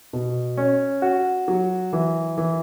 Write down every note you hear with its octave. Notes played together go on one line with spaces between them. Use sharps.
B2
C#4
F#4
F#3
E3
E3